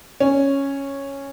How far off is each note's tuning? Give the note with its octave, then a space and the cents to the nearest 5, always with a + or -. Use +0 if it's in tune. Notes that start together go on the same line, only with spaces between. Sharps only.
C#4 -5